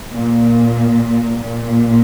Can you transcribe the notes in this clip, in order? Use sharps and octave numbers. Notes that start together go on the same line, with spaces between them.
A#2
A#2